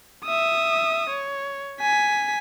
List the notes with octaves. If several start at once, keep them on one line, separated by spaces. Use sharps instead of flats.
E5 D#6
C#5
G#5 B6